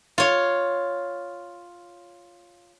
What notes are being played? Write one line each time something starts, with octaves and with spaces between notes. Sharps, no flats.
F4 C#5